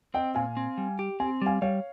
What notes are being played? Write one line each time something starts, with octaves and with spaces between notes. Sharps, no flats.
C4 D#5 G5
A#2 F5 G#5
C4
G3
G4
C4 G#5
G3 F5 G#5
G3 C#5 F5